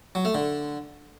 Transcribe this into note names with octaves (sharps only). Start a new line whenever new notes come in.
F#3
A3
D3